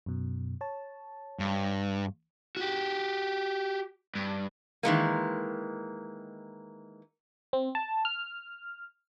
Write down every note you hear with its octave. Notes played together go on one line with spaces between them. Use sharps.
F#2 B2
C#5 A5
G2
F#4 G4
G2
D#3 E3 G#3 A#3
C4
A5
F6